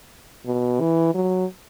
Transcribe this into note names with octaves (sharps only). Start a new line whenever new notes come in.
B2
E3
F#3